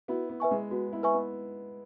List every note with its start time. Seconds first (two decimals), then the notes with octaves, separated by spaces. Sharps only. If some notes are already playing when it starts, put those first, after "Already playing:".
0.08 B3 E4 F#4
0.29 B3
0.40 B4 E5 G#5 C#6
0.51 G#3
0.71 B3 F#4
0.93 B3 E4
1.03 B4 E5 G#5 C#6
1.14 B3